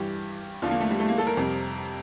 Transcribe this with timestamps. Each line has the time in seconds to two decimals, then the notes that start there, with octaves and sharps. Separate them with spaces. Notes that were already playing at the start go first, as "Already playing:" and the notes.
Already playing: G2 E3 G3 G4
0.62 E2 D3 F3 F4
0.71 A#3
0.81 A3
0.90 G3
1.00 A3
1.09 A#3
1.18 A4
1.27 A#4
1.37 F2 C3 G3